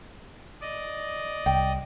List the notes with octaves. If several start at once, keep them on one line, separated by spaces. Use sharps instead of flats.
D5 D#5
C2 G5